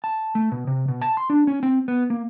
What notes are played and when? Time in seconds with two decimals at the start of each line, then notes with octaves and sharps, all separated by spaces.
0.04 A5
0.35 A3
0.52 B2
0.67 C3
0.88 B2
1.02 A5
1.17 C6
1.30 D4
1.47 C#4
1.63 C4
1.88 B3
2.10 A#3